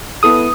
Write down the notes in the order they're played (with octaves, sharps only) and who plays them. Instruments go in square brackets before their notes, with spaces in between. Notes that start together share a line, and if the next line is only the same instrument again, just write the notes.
[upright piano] B3 E4 A4 [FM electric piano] D#6